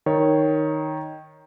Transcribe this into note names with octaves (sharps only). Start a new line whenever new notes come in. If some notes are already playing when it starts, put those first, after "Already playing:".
D#3 C#5